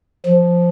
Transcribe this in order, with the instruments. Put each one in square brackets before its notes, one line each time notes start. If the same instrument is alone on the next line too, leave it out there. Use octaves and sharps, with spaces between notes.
[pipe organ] F3